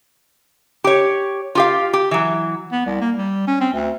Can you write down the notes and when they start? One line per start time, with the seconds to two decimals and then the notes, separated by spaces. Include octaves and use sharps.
0.84 G4 C#5
1.55 F4 G4 F5
1.93 G4
2.11 E3 F#3
2.72 B3
2.86 C2
3.01 A#3
3.17 G3
3.47 C#4
3.61 C4
3.73 D2